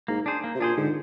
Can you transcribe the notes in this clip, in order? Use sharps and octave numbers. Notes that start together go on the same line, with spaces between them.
G#2 A#3
D4 G#4 C5
A#3
C3
A#2 D4 G#4 C5
G#2 D3